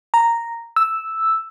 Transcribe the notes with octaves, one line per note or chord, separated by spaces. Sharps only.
A#5
E6